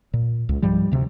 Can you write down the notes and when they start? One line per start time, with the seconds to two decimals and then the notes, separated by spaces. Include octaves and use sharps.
0.14 A#2
0.49 C#2
0.62 G#2 F3 G3
0.91 D2 C3